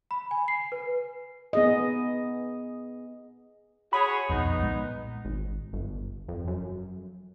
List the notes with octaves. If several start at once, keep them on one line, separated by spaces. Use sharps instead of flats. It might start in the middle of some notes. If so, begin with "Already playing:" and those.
B5
G#5
C7
B4
B3 G#4 D#5
F#4 G#4 C#5 B5
B1 F2 B3 D#4
A#2 G#3
G#1
G1
F2
F#2